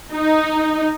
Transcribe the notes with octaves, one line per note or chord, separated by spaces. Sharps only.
D#4